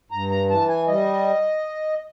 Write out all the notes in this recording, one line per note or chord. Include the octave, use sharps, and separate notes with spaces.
G2 A#5
A#5
E3 A5
G#5
G3 D#5